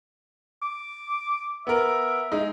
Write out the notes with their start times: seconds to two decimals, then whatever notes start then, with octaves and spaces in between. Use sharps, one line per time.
0.62 D6
1.67 B3 A#4 E5
2.32 G#3 D#4